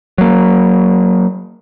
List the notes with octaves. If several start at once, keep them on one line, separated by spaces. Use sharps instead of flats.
F#3 A#3